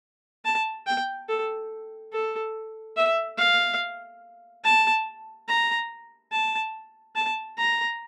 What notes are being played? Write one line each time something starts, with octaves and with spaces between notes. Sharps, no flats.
A5
G5
A4
A4
E5
F5
A5
A#5
A5
A5
A#5